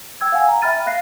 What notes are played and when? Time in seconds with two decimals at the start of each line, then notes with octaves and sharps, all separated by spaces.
0.21 G5 E6 G#6
0.32 F5 F#5 G#5
0.48 A#5
0.62 E5 G5 B5 F6 A6 D#7
0.86 F5 F#6 A#6 C7